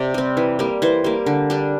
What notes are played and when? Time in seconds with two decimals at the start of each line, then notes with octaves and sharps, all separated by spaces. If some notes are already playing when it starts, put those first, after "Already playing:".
Already playing: C3 D5
0.14 G3 C4
0.37 E3
0.59 G3 A#3
0.82 E3 C5
1.04 G3 A#3
1.26 D3
1.50 G3 D4